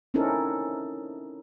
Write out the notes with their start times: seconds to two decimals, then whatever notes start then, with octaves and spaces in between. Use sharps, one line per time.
0.14 C4 C#4 D#4 E4 A4 A#4